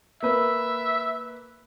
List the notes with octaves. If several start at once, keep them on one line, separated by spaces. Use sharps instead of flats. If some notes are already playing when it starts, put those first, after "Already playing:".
A#3 B4 E5